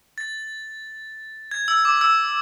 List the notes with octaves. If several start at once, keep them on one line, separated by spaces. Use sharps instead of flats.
A6
G#6
E6
D6
E6